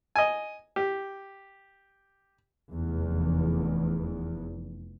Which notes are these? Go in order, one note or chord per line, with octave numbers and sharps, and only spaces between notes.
D#5 G#5
G4
F1 E2